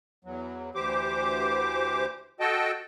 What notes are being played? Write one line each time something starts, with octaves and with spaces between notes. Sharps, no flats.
E2 F#3
D2 E3 G4 C5 D6
F#4 A4 D#5 G5 A5